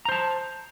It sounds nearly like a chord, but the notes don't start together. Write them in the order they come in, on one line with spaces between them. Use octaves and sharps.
A#5 C5 A5